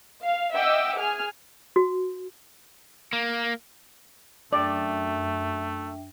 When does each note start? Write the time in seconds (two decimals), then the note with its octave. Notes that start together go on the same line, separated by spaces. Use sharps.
0.23 F5
0.55 D#5 E5 F#5 G5 D6 E6
0.97 G#4 G#5 F6
1.76 F#4
3.13 A#3
4.53 F#2 A3 D4 D5 E5 G5